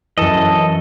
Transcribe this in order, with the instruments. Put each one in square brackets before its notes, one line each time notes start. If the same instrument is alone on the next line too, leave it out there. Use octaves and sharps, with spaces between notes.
[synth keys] F#2 E3 [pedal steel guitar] A4 D#5